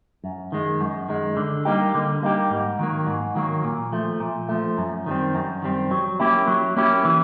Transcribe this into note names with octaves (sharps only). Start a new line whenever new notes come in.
F#2
D#3 G#3
F#2
D#3 G#3
D3
G3 A#3 D#4 G4
D3
G3 A#3 D#4 G4
G#2
D#3 F#3 A#3
G#2
D#3 F#3 A#3
A#2
F3 A3
A#2
F3 A3
F#2
D#3 G3 C4
F#2
D#3 G3 C4
F#3
A#3 C#4 E4 G4
F#3
A#3 C#4 E4 G4
E3